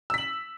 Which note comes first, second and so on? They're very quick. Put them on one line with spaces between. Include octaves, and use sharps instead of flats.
E6 B6 F#7